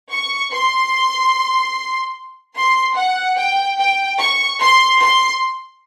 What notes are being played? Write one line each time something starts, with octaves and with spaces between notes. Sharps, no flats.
C#6
C6
C6
F#5
G5
G5
C#6
C6
C6